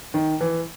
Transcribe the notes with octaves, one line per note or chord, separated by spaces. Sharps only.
D#3
E3